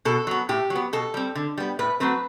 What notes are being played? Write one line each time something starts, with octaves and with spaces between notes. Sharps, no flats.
B2 A4
F#3 B3
A2 G4
F#3
B3
B2 A4
G3 C4
D3
G3 B3
A2 B4
F#3 A3 C4 B4